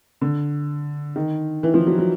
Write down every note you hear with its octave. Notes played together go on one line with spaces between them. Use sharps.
D3
D#3
E3
F3
F#3
F#3